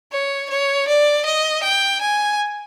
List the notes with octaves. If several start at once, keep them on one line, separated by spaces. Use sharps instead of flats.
C#5
C#5
D5
D#5
G5
G#5